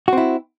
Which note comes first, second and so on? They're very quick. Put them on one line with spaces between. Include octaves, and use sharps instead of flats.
F#4 C4 E4